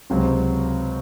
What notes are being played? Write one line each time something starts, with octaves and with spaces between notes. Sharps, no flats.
C#2 C3 F#3 C4